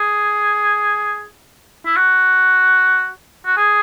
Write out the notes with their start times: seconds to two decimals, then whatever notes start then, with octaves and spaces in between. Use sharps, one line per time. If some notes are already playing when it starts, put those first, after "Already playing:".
Already playing: G#4
1.86 E4
1.97 F#4
3.46 F#4
3.57 G#4